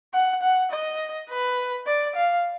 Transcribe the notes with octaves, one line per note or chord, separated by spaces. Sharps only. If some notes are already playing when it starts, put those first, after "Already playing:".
F#5
F#5
D#5
B4
D5
F5